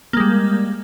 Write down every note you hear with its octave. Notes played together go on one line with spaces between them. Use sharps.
G3 G#3 A#3